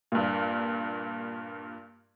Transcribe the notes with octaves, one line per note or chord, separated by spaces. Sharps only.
G2 A#2